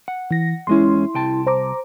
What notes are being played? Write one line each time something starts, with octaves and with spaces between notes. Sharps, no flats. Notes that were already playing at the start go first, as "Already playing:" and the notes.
F#5
E3 A#6
E2 G#3 C#4 E4 C6
C2 G5 A5
C5 A#5 D6